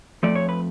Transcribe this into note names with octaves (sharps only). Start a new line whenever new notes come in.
F2 F3 A3 D5
C#5
B4